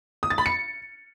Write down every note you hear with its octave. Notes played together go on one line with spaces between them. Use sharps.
D#6
A6
B5
C#7